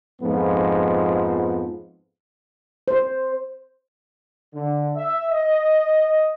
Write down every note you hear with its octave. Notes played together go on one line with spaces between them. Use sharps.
F2 G#2 F3 B3
C5
D3
E5
D#5